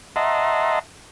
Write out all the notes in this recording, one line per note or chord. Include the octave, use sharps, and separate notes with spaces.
D#5 E5 F#5 A5 A#5 C6